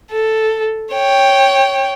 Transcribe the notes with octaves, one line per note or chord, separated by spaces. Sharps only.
A4
C#5 G5